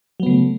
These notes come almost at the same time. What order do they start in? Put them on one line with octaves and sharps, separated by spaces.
F#3 B3 C#3 A3